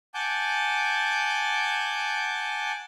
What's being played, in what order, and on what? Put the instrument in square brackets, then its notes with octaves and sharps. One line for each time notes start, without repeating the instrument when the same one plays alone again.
[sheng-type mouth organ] F#5 G#5 A5 D6 G6